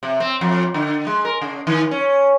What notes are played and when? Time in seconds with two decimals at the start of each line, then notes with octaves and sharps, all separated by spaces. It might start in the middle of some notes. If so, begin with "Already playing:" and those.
0.03 C3
0.20 C4
0.41 F2
0.74 D3
1.07 G#3
1.25 A#4
1.42 C#3
1.67 D#3
1.91 C#4